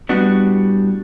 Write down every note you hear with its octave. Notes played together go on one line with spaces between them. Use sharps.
A2 G3 B3 D4 F#4